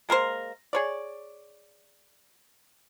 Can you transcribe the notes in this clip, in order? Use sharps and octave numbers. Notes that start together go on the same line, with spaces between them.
G#3 A#3 A#4 C5
G#4 C#5 D5